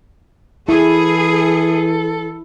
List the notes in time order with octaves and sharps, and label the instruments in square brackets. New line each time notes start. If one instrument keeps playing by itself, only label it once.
[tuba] E3 [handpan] E4 [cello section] G#4 [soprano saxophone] A4